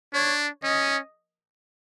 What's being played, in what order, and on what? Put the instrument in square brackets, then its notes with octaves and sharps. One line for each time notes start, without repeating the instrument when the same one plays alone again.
[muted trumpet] D4 [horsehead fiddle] C#5
[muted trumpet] C#4 [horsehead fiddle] D#5